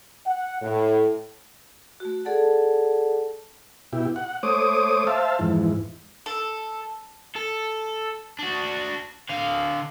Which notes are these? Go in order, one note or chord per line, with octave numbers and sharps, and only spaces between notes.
F#5
A2
A3 F#4
G#4 A4 D5 F#5 A5
B2 E4 G4
F#5
A3 C5 C#5 D6 D#6
C5 E5 F5 A5
F2 G#2 E3
A4
A4
D4 F#4
D3 F5